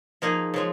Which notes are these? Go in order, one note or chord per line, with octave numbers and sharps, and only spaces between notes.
F3 A#3 D#4 G#4
C#3 F3 G#3